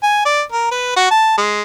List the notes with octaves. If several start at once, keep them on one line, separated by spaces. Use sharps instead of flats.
G#5
D5
A#4
B4
F#4
A5
G#3